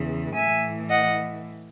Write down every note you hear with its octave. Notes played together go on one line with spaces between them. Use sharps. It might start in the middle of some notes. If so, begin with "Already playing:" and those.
Already playing: E2 C#3 E3
A2 E3 E5 G#5
D#5 F#5